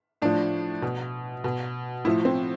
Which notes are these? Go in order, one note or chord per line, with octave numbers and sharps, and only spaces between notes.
A2 F3 D4
B2
B2
A2 F3 E4
C4